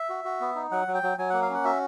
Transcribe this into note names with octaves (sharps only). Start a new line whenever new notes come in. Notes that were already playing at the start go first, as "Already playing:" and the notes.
Already playing: E5
F#4
F#4
B3
D#4
F#3 F#5
F#3
G5
F#3
F#3 G#5
A#3 F#5
F5
C#4 F#5
F#4 E5